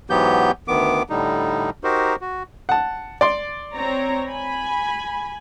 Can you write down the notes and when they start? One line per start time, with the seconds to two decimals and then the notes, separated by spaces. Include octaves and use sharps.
0.10 G#2 E3 F#3 B3 G4 G6
0.68 D2 D#3 B3 D6
1.10 A2 D3 G3 D#4
1.84 D#4 F#4 G4 A#4 C5
2.21 F#4
2.69 F#5 A5
3.21 D5 C6
3.72 C4 C#5 A#5
4.28 G#5 B5